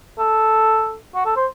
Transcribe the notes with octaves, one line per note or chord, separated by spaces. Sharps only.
A4
F#4
A4
C5